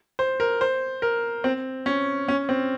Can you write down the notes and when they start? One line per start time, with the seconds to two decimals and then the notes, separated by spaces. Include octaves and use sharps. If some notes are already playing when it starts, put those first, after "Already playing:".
0.19 C5
0.40 A#4
0.61 C5
1.02 A#4
1.44 C4
1.86 C#4
2.28 C#4
2.49 C4